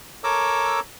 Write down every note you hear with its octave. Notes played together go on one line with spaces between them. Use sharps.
A4 A#4 C#5 A#5 D6 E6